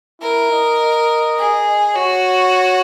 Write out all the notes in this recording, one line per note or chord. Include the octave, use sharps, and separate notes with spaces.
E4 A#4
D#5
G#4
F#4 C#5